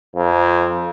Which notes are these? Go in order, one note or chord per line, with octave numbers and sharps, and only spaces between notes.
F2